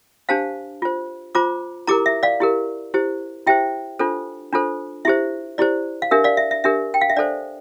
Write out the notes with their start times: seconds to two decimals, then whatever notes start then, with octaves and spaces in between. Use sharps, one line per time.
0.29 D4 G4 C5 F5 A5
0.82 F4 C5
1.35 F4 C5 A#5 D6
1.87 E4 G4 A#4 A#5 D6
2.06 E5
2.23 D5 F5
2.40 E4 G4 A#4
2.94 E4 G4 C5
3.46 E4 G4 C5 E5 G5
3.99 D4 F4 A4 C5
4.53 D4 F4 A4 C5
5.05 E4 G4 C5 E5
5.58 E4 G4 C5 D5
6.02 F5
6.11 D4 G4 A#4 E5
6.24 D5 F5
6.37 E5
6.51 E5
6.64 D4 G4 A#4 E5
6.94 G5
7.01 F5
7.10 E5
7.17 D4 A4 C5 D5